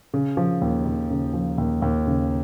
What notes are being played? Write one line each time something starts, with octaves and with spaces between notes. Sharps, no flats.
C#3
F3
D#2
D#2
C#3
F3
D#2
D#2
C#3